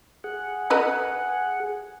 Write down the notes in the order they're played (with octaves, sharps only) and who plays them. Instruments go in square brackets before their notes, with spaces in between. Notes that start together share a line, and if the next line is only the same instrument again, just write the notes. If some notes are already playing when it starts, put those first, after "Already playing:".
[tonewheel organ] G#4 F#5
[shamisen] A4 B4 D#5